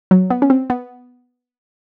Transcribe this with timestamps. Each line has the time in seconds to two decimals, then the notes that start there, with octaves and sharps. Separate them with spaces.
0.11 F#3
0.30 B3
0.42 C#4
0.50 C4
0.70 B3